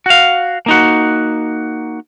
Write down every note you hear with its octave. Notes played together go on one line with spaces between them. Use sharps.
F#4 F5
A#3 D#4 F#4